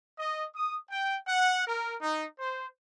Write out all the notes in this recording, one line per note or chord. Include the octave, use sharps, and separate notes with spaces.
D#5
D#6
G5
F#5
A#4
D#4
C5